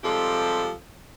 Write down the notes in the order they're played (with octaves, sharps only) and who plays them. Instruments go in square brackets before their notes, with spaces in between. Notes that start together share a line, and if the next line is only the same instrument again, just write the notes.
[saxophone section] C3 F3 G3 G#3 G4 A4